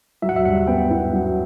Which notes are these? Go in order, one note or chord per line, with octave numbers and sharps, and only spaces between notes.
F#3 E5
F#5
E5
G2 F#5
B3 G5
E4
F#3